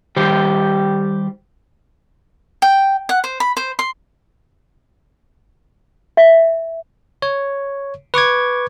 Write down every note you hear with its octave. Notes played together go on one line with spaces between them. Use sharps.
D#3 G3 G4 C5
G5
F#5
C5
B5
C5
C6
E5
C#5
B4 C#6 D6 G#6